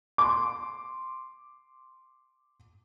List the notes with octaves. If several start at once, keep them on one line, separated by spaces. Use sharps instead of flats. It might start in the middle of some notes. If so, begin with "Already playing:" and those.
C6 D6